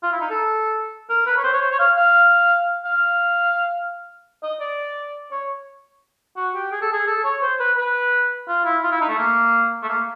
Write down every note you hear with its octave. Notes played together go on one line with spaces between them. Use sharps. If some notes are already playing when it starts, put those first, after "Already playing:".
F4
E4
D#4
A4
A#4
B4
C#5
C5
C#5
C5
C#5
F5
F5
F5
D#5
D5
C#5
F#4
G4
G#4
A4
G#4
A4
C#5
C5
B4
B4
F4
E4
F4
E4
D#4
A3
A#3
A3
A#3